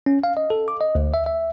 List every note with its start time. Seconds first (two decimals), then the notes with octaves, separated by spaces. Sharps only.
0.06 C#4
0.24 F5
0.37 D#5
0.50 A4
0.68 D6
0.81 D#5
0.95 D2
1.14 E5
1.26 E5